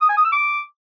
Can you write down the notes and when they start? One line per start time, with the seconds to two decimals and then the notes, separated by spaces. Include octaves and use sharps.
0.02 D#6
0.09 G#5
0.17 D#6
0.25 E6
0.32 D6